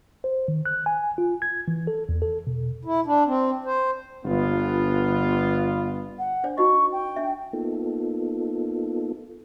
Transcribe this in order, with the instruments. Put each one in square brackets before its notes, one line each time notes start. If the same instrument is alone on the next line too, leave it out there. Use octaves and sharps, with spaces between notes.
[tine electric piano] C5
D#3
F#6
G#5
F4
G#6
E3
A4
E2
A4
B2
[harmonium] E4
D4
C4
C5
[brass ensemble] G1 B3 F4
[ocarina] F#5
[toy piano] D4 C5 D5
[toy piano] D#4 F#4 D#5 [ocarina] C#6
[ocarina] G5
[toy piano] D4 E5
[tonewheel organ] A#3 B3 D#4 F4 A4